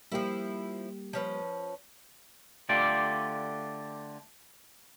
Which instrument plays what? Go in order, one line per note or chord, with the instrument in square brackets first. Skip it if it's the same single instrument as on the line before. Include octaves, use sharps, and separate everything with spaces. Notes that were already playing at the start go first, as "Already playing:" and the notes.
[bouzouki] F3 E4 [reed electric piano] G3 A#3 G4
[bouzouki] F3 C#4 B4
[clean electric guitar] D3 A3 F4 G4 D5